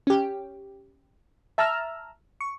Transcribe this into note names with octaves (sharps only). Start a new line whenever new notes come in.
C#4 G4
E5 A5 A#5 E6 F6
C#6